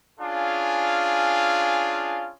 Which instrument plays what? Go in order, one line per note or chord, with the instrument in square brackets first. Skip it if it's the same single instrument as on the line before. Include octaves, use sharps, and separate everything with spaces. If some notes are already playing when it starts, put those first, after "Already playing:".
[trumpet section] C#4 D4 F4 G#4 F5